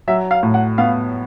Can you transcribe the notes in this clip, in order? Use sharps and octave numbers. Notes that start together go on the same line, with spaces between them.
F#3 E5
F5
A2
F#5
B3 F5